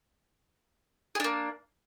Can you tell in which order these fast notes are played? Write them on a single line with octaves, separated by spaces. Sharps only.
G#4 D4 A#3